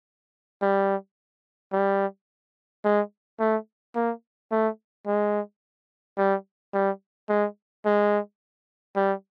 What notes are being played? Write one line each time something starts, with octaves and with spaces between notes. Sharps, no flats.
G3
G3
G#3
A3
A#3
A3
G#3
G3
G3
G#3
G#3
G3